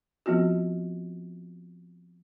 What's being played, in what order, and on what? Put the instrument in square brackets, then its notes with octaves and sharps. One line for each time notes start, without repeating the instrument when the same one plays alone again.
[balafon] F3 B3 C4 F4 F#4